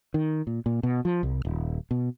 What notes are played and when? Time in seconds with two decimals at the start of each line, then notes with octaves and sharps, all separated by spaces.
0.14 D#3
0.47 A#2
0.66 A#2
0.83 B2
1.05 F3
1.23 C2
1.45 D#1
1.91 B2